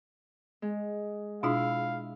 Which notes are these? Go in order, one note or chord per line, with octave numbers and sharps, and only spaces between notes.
G#3
B2 D4 E4 F4 F5